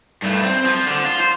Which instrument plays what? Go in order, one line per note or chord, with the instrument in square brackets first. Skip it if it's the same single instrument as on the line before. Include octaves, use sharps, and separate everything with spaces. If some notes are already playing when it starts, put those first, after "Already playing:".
[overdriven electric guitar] G2 A3
C4
F3
D3
F4
C5